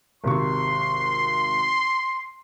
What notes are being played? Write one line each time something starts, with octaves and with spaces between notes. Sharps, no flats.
G#1 C3 C6 C#6